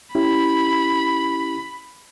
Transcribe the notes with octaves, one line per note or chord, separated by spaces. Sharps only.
C#4 E4 G4 B5